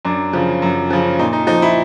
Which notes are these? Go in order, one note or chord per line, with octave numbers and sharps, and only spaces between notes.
F#2 D4
C#3 F3
F#2
C#3 F3
A#2 D#4
D#4
F3 D#4
E4